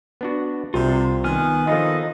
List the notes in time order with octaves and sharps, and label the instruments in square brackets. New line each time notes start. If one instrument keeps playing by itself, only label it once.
[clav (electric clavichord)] B3 D4 F#4
[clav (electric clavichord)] C2 [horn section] C3 [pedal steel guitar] F4 C6
[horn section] D#3 [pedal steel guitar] B3 G#5 F6
[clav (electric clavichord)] F3 F4 [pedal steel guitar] B3 D#4 A4 [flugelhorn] D#5